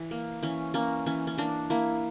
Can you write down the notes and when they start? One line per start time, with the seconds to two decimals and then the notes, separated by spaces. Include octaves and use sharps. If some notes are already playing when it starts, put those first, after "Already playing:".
Already playing: E3
0.11 A#3
0.43 E3 C#4
0.74 A#3 C#4
1.06 E3 C#4
1.27 C#4
1.38 A#3 D4
1.70 A#3 E4